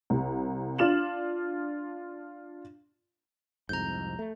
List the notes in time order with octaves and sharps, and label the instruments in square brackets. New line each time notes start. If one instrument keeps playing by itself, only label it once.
[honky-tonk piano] C2
D4 F4 E7 F#7
[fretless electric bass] C2 F2 G#2 [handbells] A#5 G6
[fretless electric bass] A3